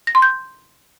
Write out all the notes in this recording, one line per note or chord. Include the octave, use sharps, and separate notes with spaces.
A#6
C6
G6